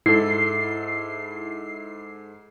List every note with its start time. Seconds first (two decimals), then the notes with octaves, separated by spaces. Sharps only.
0.06 G#2 E4 A4 C7